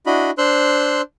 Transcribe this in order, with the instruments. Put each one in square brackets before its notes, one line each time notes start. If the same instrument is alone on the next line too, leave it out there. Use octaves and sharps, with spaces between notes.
[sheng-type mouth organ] D4 E4 F#4 D#5 B5
D4 C5 C6 E6 F#6